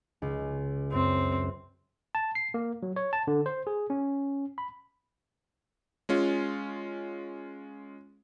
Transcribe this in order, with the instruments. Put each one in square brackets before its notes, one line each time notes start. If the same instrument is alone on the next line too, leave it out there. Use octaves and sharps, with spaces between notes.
[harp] C#2
[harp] F#2 [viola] C4
[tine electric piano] A5
C7
A#3
F#3
C#5
A5
D3
C5
G#4
C#4
B5
[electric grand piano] G#3 C#4 F4